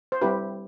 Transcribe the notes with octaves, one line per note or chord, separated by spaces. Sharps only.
C5
G3 C4 E4 G4 B4